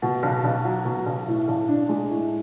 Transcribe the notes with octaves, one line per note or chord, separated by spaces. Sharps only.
B2
B1
B1
F#3
B2
B1
A2
B1
D4
G#3
A2